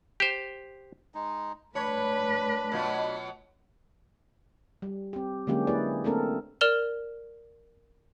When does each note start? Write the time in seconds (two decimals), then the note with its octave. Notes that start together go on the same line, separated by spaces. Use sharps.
0.20 G4 C5
1.15 G#3 D#4
1.75 A3 D4 B4 C#5 B5
2.72 B2 F#3 F4
4.82 G3
5.13 C4 G4
5.47 D3 F#3 G#3 A#3 C#4 G4
5.67 A#3 E4 G#4 B4 D5
6.04 A3 A#3 C4 D4 A4 A#4
6.61 A#4 D5 F6 E7 F7 G7